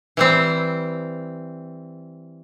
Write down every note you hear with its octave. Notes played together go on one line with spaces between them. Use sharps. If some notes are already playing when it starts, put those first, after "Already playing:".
E3 G3 C4